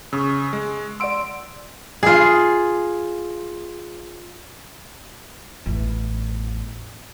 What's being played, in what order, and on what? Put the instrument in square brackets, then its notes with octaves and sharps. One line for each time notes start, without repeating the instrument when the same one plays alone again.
[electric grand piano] C#3 [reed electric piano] C#6 D#6 E6
[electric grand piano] G#3
[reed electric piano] D5 F#5 C6 [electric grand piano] E6 D7
[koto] F4 G#4
[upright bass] A1 E2